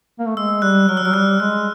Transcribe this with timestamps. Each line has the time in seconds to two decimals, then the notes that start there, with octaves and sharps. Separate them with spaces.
0.19 A#3
0.28 A3
0.37 G#3 E6
0.62 G3 F#6
0.88 F#3 F6
0.97 E6
1.03 F#3 F6
1.14 G3 F#6
1.40 G#3 F#6